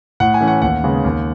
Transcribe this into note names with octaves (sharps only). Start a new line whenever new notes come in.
A2 F#5
G#5
E3 A3 C#4
F#5
D#2 F#5
C#3 G#3 B3
D#2